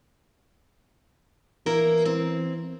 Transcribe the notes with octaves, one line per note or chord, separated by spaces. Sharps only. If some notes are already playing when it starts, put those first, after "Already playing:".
E3 A#3 E4 A#4
C4